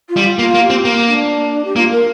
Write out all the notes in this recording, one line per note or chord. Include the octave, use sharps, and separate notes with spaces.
F4
G3
F4
A#3 F4
A#3
G4
C4
A#3
D4
G4
A#3 F4
A#4